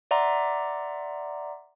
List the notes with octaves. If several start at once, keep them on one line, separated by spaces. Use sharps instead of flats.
D5 E5 F#5 A#5 C6 D6